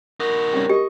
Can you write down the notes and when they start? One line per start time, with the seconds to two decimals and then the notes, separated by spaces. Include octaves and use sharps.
0.20 D#4 F#4 A#4
0.53 G3 C4 C#4
0.69 G4 D#5 C#6